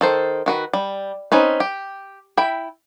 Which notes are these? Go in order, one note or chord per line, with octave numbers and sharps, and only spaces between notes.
D#3 A4 C5
D#3 F#4 B4
G3
C4 C#4 D#4 B4
G4
E4 G5 B5